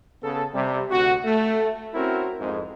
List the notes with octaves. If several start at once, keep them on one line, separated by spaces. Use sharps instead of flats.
C#3 B3 A4
C3 G3
D2 C3 F#4
A3
C4 C#4 E4 F#4 A#4
F2 G#2